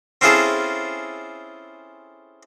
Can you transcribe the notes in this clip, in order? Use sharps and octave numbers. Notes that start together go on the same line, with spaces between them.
C4 C#4 E4 F4 G#4 A4